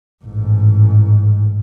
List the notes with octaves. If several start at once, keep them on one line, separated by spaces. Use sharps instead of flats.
A1 G#2